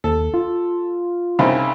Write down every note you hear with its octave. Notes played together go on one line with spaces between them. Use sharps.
D#2 A4
F4
C2 C#3 D#4